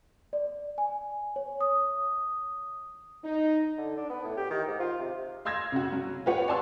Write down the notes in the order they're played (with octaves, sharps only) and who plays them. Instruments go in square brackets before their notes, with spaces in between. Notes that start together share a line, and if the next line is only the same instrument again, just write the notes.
[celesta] D5
G#5
C#5
D#6
[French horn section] D#4
[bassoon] D3
D4
B3
A2
G4
D#3
G#2
F4
C3
[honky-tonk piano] F5 C6 E6 G#6 A#6
C#3 F#4
F#3
F4 G4 B4 C#5 F#5
D5 G#5 A5 C6 E6